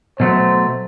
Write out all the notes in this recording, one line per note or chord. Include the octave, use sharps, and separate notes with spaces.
B2 F#3 A3 C5